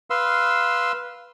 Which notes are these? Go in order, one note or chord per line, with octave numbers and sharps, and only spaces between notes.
B4 F5 C6 E6